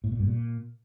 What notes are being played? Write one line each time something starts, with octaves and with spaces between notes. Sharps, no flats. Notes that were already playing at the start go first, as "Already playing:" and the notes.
A2
A#2
G2
A#2